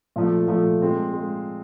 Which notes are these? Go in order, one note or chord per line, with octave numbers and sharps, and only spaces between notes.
A#2 F3 A3
A#2 F3 A3
G#3 C4 F4
G#3